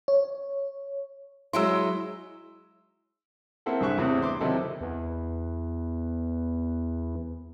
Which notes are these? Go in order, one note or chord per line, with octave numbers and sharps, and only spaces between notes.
C#5
F#3 G#3 E4 C6 E6
A#3 C4 E4 A4 F#5
C2 G2 G#4 E5 C#6 F#6
E2 A2 C3 C4
B3 C6 D6
C3 D#3 F#3 E4 A4 D#5
E2 B3